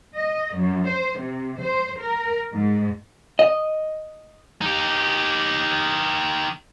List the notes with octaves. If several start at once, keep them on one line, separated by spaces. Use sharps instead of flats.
D#5
F#2
C5
C3
C5
A#4
G#2
D#5
D#4 G4